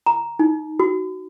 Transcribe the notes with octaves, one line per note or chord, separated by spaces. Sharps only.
A#5
D#4
F#4